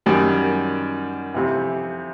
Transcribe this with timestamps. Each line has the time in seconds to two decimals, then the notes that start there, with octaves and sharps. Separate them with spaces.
0.06 F#2 D#3 G3
1.34 F2 C3 E3